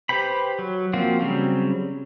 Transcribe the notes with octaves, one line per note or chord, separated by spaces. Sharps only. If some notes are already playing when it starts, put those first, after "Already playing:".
G4 B4 C5 G5 B5
F#3
F3 A#3 C4 F4 F#4
C#3 F#3 G3 C4